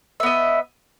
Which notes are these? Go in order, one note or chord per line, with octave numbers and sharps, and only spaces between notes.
B3 D#5 E5